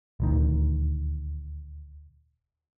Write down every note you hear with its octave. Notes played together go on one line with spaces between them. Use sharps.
D#1 D2 D#3